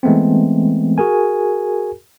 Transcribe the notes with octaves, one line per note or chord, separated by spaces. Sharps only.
E3 G#3 A3 B3 C4
F#4 G#4 A#4 G#5